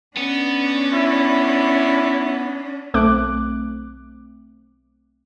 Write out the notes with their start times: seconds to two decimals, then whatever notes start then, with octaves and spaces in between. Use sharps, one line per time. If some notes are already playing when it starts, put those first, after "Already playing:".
0.17 B3 C#4 D4
0.93 E4
2.94 B1 A3 C4 D6 F#6